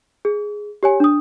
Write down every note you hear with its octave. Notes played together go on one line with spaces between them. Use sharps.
G#4
G4 C#5 G#5
D4 D#6